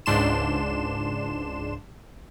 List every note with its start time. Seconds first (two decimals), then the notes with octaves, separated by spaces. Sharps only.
0.06 C#2 G#2 D4 C6 E7